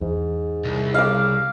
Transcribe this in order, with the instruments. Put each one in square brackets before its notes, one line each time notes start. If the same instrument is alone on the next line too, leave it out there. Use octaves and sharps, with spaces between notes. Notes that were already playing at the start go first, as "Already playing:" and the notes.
[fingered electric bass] E2 [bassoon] G#2
[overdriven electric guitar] C2
[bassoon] C#3 [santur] F5 D6